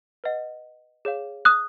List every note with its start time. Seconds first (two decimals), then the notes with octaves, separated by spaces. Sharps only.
0.24 B4 D#5 F#5
1.05 G#4 C#5 F5
1.45 D#6 F#6